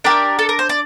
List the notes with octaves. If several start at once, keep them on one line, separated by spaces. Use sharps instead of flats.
D4 G4 A#4 D5
A4
A#4
C5
D5